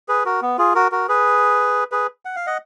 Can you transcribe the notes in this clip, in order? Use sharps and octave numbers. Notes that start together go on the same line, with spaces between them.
G#4 B4
F#4 A#4
B3
F4 G#4
F#4 A#4
F#4 A#4
G#4 B4
G#4 B4
F#5
F5
D#5 F#5